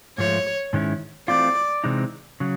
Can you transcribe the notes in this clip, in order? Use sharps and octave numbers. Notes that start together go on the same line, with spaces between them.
G#2 F3 A3 C#5
G#2 D#3 G#3 C#4 E4
E3 A3 C4 F4 D5
C3 E3 G#3 C4 D#4
C#3 F#3